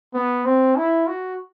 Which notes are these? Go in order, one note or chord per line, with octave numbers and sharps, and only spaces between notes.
B3
C4
E4
F#4